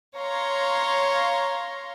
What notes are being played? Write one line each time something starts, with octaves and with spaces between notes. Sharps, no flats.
C#5 F5 A#5 C6